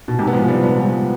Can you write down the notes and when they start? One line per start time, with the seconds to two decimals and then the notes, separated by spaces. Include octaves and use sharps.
0.08 B2
0.19 G#2 C3
0.27 B3
0.33 F3 G#3
0.48 G3 B3
0.62 G3 B3
0.78 F3 G#3